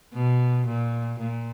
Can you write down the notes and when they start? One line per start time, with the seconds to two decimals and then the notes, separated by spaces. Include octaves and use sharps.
0.13 B2
0.67 A#2
1.20 A#2